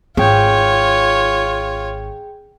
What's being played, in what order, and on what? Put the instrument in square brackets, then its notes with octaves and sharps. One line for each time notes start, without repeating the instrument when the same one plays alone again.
[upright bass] G#1 C4 [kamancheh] F4 C#5 [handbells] G#4 G5 G6